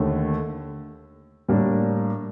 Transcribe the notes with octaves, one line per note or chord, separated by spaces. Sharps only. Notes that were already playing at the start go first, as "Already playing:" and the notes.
Already playing: D#2 D3 A3
A2 G3 A#3 D4